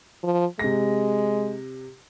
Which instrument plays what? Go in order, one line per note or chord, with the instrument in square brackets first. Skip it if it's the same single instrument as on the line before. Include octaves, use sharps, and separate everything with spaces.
[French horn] F3
[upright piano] C3 A#6 [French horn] G#3